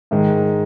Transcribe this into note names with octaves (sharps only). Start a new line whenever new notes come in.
G#2 D#3 G#3